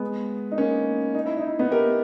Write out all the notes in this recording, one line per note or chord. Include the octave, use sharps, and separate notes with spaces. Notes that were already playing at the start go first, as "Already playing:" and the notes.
Already playing: G#3 B3
D#4
A#3 C#4
D#4
E4
D#4
E4
B3 D#4
G4 A#4